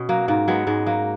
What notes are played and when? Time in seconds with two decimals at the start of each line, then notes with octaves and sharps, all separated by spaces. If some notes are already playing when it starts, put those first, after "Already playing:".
Already playing: B2 C#4
0.09 F#3 A#3
0.28 G#2 A#3
0.48 F#3 G#3 B3
0.67 G#2 G#3
0.86 F#3 A#3